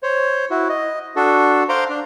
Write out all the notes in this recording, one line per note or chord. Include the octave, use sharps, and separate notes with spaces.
C5 C#5
E4 F#4
D#5
D4 F#4 A4
C5 F5 A#5 C6 D6
D4